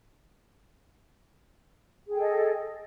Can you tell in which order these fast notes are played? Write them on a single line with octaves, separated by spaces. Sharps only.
G#4 G5 A4 D#5